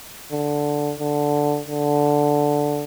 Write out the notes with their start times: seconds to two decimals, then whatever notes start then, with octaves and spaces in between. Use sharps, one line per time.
0.32 D3
1.00 D3
1.68 D3